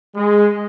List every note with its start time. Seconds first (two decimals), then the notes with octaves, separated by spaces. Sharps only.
0.15 G#3